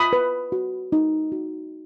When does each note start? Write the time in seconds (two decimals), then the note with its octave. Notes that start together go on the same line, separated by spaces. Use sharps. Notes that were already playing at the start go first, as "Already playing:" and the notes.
Already playing: F4 B5 D#6
0.13 B4
0.52 F#4
0.92 D#4
1.32 F#4